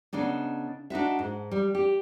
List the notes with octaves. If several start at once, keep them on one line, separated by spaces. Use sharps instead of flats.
C#3 B3 D4 D#4
D4 D#4 F#4 E5
G#2
G3
G4